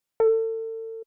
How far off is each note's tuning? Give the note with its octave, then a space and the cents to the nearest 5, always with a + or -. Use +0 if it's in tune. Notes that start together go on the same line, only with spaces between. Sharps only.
A4 +35